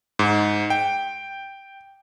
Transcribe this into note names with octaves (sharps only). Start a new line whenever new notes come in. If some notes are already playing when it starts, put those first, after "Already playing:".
G#2
G5